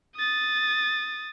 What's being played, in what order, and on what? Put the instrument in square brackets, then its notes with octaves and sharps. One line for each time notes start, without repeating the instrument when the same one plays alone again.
[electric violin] D#6 A6